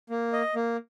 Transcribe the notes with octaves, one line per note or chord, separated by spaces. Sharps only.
A#3
D#5
A#3